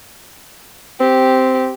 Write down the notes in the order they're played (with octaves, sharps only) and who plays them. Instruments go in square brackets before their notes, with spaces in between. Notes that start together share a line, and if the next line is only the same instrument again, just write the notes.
[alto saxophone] C4 [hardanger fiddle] G4